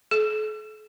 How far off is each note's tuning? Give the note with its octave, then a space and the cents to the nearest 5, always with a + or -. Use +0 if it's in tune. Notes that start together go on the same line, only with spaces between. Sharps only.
A4 -45